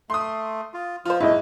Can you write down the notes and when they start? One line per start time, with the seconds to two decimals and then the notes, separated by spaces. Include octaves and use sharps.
0.10 A3 C6 D#6
0.74 F4
1.05 F3 F4 C5
1.21 G#2 B2 A3 E4 D#5